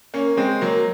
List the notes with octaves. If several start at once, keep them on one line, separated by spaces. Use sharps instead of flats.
A#3 C#4
G#3 C4
F#3 A#3